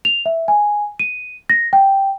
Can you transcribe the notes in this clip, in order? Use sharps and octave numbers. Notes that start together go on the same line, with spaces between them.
F7
E5
G#5
D#7
A#6
G5